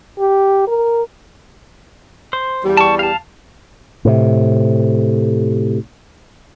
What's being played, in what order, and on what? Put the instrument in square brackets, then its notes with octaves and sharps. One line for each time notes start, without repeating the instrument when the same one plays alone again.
[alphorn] G4
A#4
[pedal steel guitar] C5
[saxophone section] E2 G3
[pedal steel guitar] A5 C#6
F5 A5
[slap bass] A2 C3